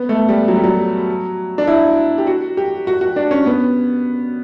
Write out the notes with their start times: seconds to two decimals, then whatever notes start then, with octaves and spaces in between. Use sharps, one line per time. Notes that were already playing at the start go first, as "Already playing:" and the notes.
Already playing: B3
0.09 A3
0.29 G3
0.48 F#3
0.56 G3
0.64 F#3
1.58 D4
1.67 E4
2.18 G4
2.27 F#4
2.57 G4
2.87 F#4
3.01 F#4
3.16 D4
3.31 C#4
3.46 B3